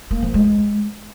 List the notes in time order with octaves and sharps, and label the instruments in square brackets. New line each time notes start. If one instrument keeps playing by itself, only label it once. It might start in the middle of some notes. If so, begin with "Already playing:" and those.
[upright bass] A#3
F3
G#3